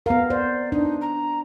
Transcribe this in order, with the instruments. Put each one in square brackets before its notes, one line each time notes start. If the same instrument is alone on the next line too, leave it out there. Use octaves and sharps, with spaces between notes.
[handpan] B3 A#4 [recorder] F5
[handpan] C5 [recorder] D5
[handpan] D4 [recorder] D#4
[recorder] A#5